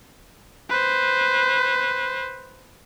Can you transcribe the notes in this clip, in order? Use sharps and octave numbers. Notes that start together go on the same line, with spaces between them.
B4 C5